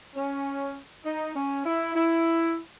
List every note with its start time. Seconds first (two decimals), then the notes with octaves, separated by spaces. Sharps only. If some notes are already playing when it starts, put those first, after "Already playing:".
0.15 C#4
1.05 D#4
1.36 C#4
1.65 E4
1.95 E4